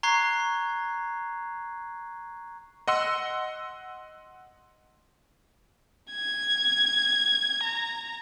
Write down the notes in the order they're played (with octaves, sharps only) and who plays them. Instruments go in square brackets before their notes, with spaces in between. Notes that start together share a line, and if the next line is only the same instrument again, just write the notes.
[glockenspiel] A#5 C#6 F#6 G#6 C7
[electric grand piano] D#5 F#5 C6 E6
[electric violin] G#6
A#5